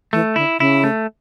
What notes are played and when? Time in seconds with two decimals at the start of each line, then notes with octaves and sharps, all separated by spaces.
0.13 E3 A3
0.36 D3 E4
0.59 C#3 E4
0.84 A3